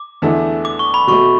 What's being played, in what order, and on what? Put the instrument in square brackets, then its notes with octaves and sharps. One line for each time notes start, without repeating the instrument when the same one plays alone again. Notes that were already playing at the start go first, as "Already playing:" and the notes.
Already playing: [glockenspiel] D6
[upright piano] E2 D3 A3 E4 A4
[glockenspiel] D6
C#6
B5
[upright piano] B2 F#3 A3 [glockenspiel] C#6